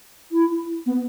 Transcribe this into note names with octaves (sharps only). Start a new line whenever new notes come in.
E4
B3